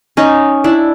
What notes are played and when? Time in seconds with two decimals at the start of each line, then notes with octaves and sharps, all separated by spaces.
0.17 C#4 D#4
0.64 D4 E4